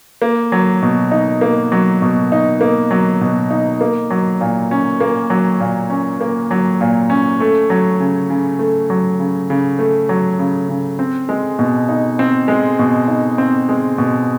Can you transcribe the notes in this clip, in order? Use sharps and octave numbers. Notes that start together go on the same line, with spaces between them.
A#3
F#3
B2
D#4
A#3
F#3
B2
D#4
A#3
F#3
B2
D#4
A#3
F#3
A#2
C#4
A#3
F#3
A#2
C#4
A#3
F#3
A#2
C#4
A3
F#3
C#3
C#3
A3
F#3
C#3
C#3
A3
F#3
C#3
C#3
C4
G#3
B2
D#4
C4
G#3
B2
D#4
C4
G#3
B2